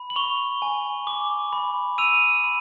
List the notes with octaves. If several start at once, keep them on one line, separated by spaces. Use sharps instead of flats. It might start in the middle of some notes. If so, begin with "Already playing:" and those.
Already playing: B5
F#7
C#6 F7 G7
G#5
D6
B5
E6 D#7 F7
B5